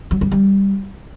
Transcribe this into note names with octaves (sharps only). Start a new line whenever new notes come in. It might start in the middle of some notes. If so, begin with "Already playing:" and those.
F#3
G3
G3